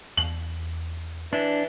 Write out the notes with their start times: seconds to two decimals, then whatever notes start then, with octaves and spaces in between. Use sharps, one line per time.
0.17 E2 F#7
1.33 E3 D4